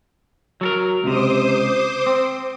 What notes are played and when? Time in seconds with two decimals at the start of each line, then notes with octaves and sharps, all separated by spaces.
0.61 F#3 A4 A#4
1.04 C#2 C3 C5 D6 D#6
2.07 C4